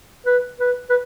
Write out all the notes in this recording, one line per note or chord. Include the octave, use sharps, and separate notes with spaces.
B4
B4
B4